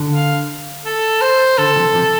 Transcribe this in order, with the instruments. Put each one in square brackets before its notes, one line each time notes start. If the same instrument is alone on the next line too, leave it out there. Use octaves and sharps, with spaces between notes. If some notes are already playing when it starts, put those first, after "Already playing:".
Already playing: [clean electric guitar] D3
[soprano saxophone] F5
A4
C5
[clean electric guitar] D3 [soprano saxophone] A4
[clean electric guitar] C3 F3
C3 F3